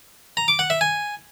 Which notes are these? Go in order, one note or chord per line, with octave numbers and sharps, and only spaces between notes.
A#5
D6
F#5
E5
G#5